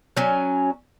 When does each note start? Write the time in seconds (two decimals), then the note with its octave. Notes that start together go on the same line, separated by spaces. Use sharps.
0.17 F#3 C#4 G#5